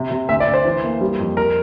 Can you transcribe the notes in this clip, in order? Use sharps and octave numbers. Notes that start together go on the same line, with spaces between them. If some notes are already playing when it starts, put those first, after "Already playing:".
Already playing: C3
C3
D2 E5
D5
D2
C5
E3
A#3
G3
F2
A#4